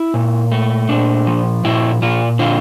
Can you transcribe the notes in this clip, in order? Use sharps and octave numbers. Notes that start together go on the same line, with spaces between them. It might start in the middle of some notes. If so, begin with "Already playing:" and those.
Already playing: E4
A#2
A3
A#2 D4
F3
A#2 E4
A#2 F4
D3 F4